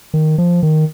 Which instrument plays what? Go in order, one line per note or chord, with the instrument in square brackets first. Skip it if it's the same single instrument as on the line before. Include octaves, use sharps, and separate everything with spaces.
[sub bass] D#3
F3
D#3